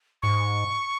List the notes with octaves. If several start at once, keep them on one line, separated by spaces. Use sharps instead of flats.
G#2 C#6